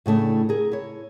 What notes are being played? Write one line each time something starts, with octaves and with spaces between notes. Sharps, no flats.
A2 C#3 A3 D4
G#4 A#4
E4 C#5